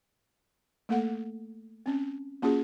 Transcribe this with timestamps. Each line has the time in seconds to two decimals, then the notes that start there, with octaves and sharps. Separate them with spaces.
0.89 A3 A#3 A4 F#5
1.86 C4 C#4
2.42 A#3 C#4 F4 F#4 G#4